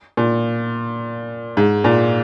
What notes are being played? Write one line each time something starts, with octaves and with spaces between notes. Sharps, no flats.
A#2
G#2
A#2